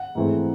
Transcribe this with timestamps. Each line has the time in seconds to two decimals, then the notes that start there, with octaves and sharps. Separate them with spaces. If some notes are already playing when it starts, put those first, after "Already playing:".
Already playing: F#5
0.15 G#2 E3 A3 C4